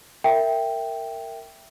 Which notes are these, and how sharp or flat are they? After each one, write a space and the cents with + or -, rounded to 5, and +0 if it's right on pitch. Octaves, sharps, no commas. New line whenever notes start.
A#4 -20 E5 +0 G5 +0